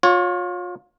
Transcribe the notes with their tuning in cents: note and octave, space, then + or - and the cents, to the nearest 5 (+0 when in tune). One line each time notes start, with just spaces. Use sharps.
F4 +35 C#5 +0